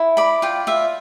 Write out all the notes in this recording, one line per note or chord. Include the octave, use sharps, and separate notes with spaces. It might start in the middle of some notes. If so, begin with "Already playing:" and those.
Already playing: E4
D5 B5
F4 G5
F4 E5